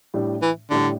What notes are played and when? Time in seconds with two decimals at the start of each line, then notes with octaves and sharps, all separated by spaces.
0.14 A2 G3 D4
0.42 E3
0.70 A2 D3 G3 D4